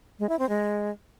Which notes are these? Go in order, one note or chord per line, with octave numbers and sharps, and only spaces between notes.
G#3
E4
C4
G#3